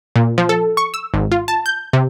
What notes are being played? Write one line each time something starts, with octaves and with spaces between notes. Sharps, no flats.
A#2
F3
A4
C#6
E6
G#1
F4
A5
G6
C3